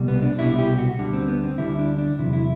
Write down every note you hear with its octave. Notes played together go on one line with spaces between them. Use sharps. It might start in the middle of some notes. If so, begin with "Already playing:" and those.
Already playing: C2 B2 G3
B3
D4
C2 B2 G3 E4
G4
F#4
D2 D3 G3
C4
B3
C4
D2 D3 G3 E4
D4
D4
E2 C3 F#3 E4
E4